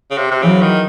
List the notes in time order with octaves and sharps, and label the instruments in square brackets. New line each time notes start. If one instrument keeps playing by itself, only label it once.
[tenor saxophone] C#3
C3
C3
[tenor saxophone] C#3 [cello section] E3 F#3
[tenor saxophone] D#3